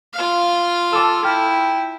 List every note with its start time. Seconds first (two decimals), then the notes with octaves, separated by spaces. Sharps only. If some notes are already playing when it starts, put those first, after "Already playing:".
0.14 F4 F5
0.93 A4 A5 D6 E6
1.25 E4 G5 F6